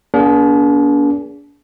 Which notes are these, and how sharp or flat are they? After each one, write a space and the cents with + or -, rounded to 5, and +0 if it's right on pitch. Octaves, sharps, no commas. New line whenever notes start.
A#3 +40 D4 -40 G#4 +0